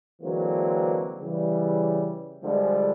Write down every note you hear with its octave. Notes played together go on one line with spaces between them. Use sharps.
D3 E3 F#3 G#3 A#3 C4
C#3 E3 G3
D3 F3 G3 G#3